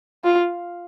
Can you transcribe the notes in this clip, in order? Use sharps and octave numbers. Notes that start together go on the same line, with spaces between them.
F4